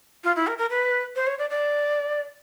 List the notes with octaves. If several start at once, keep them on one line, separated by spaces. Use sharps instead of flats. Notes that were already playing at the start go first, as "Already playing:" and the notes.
F4
E4
A#4
A#4
B4
C5
C#5
D5
D5